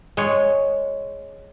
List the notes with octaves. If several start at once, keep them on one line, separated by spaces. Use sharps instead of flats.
G#3 C#5